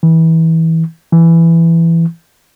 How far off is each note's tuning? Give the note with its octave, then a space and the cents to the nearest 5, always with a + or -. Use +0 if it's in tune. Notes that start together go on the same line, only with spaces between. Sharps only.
E3 -25
E3 +10